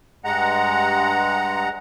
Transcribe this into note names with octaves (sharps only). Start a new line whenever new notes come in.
G2 G#3 F#5 A#5